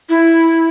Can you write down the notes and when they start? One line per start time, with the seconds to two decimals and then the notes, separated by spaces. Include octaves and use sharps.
0.09 E4